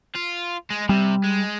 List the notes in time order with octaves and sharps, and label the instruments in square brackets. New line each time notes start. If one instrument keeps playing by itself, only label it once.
[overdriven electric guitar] F4
G#3
[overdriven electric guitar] C3 [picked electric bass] G3
[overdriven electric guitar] G#3